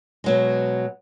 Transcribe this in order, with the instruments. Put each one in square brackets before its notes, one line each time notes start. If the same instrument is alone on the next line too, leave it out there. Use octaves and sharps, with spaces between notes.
[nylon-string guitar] B2 F#3 G#3